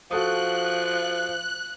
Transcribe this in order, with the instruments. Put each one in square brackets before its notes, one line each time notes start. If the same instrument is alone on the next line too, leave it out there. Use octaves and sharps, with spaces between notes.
[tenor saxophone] F3 [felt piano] F#4 A4 D#6 [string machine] F#6